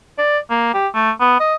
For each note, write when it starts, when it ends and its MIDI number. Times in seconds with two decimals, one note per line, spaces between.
0.18 0.38 74
0.50 0.69 58
0.74 0.88 67
0.95 1.11 57
1.20 1.40 59
1.40 1.55 75